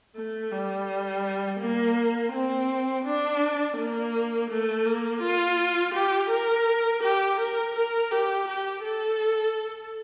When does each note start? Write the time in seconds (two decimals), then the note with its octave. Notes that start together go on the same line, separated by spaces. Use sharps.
0.15 A3
0.51 G3
1.59 A#3
2.32 C4
3.05 D4
3.77 A#3
4.50 A3
4.85 A#3
5.22 F4
5.94 G4
6.31 A#4
7.03 G4
7.39 A#4
7.75 A#4
8.11 G4
8.47 G4
8.84 A4